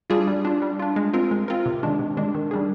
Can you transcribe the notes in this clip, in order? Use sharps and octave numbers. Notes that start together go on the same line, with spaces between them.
G3 D4 F4 G#4
G3
D4 F4
G3
D4 F4
G#3
C4 F4 A#4
G#3
C4 F4 A#4
C3
D#3 G#3 D4
C3
D#3 G#3 D4
D#3
G3 D4 G#4